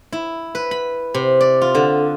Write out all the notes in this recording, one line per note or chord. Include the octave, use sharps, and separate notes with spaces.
E4
B4
B5
C3
D5
F4
D3